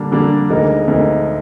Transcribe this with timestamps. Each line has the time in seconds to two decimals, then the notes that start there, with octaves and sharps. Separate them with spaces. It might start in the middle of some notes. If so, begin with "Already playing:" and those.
Already playing: D3 G3 A#3 D4
0.12 D3 G3 A#3 D4
0.50 D2 D3 G#3 D#4 A#4
0.87 D2 D3 G#3 D#4 A#4